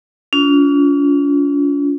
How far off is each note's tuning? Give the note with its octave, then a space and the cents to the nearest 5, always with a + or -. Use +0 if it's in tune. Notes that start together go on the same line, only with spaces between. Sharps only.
C#4 +45 F4 +0